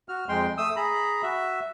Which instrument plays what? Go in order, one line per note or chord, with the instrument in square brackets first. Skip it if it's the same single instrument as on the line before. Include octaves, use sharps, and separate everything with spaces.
[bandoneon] F#4 F6
F2 G#3 G5 C6
A3 D#6 E6
G#4 A#5 B5
F#4 E5